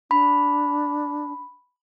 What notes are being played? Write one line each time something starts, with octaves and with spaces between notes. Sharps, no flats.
D4 B5